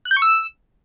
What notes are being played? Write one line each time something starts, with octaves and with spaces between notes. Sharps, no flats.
F#6
G6
C#6
E6